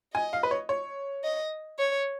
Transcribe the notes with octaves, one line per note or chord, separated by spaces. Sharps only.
D#5 G#5
F5
B4
C#5
C#5
D#5
C#5